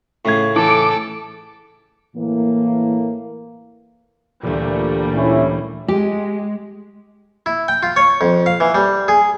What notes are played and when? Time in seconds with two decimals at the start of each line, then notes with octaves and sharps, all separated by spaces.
0.25 A2 C#3 C#6 G#6
0.56 E3 A4 D6
2.16 A2 E3 A#3
4.43 D2 A#2 E3 G3 A3 A#3
5.15 C#4 E4
5.88 G#3 G4
7.46 E4
7.68 G5
7.83 F4
7.96 C#5
8.21 F2
8.46 F5
8.60 E3
8.75 G3
9.08 G#4